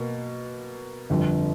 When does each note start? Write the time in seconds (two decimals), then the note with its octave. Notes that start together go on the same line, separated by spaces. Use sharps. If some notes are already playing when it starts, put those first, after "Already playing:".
Already playing: B2 A#3
1.10 G1 F2 D3